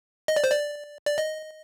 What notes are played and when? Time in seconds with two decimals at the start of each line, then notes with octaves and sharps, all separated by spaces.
0.28 D#5
0.36 D5
0.44 C5
0.51 D5
1.06 D5
1.18 D#5